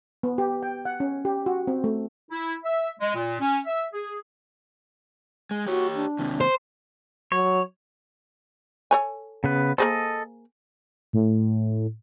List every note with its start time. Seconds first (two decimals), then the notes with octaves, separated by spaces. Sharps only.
0.23 B3
0.38 G4
0.63 G5
0.85 F#5
1.00 C#4
1.25 G4
1.46 F#4
1.67 C4
1.84 A3
2.31 E4
2.64 E5
3.00 G#3
3.15 A#2
3.40 C#4
3.66 E5
3.93 G#4
5.51 G#3
5.67 F#4 G4 C#5
5.96 D4
6.19 D#2 C3
6.41 C5
7.32 F#3 C#5
8.91 A4 C#5 G#5
9.44 C#3 B3 B4
9.78 A#3 G#4 A4 C5 D#5
11.13 A2